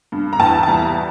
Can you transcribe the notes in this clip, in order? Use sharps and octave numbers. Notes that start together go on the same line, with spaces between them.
G2
A#5
E2 A5
A5
G3 A#5